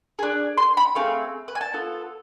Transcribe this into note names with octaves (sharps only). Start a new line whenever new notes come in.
D4 G#4
C6
B5
A3 C4 G#4 F5
B4
G#5
A5
B3 F4 A4